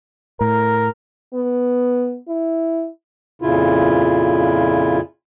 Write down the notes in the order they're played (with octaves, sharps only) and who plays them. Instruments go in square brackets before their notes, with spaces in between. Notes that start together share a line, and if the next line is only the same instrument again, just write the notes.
[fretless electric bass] A2 [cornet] A#4
[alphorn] B3
E4
[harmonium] F2 A#2 C#3 E4 F4